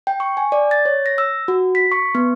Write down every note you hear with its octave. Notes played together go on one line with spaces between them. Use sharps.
G5
C#6
G#5
D5
A6
C#5
A#6
E6
F#4
B6
C#6
B3